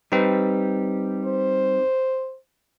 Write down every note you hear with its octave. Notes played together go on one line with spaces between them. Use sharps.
G3 C4 D#4 G4 B4
C5